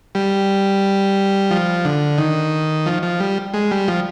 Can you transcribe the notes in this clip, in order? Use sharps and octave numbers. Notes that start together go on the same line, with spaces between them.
G3
F3
D3
D#3
F3
F3
G3
G#3
G3
F3